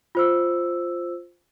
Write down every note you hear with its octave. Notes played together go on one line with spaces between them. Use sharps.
F4 C5 E6